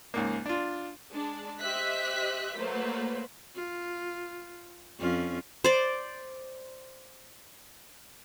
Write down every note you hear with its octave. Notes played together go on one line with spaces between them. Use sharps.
C#2 G#2 A#3
D4 F4
G#3 D4
G4 C5 D#5 E5 F#6 B6
F#3 A3 A#3 B4 C5
F4
F2 C#4 F4
C5 D5